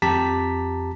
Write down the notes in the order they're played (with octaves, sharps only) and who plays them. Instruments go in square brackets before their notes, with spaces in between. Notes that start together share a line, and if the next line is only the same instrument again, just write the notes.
[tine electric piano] F2 G4 A5 A#5 B6